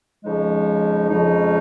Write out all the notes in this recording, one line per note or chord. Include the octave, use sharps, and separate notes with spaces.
F2 C#3 F3 G#3 D#4
F2 C#3 F3 G#3 D#4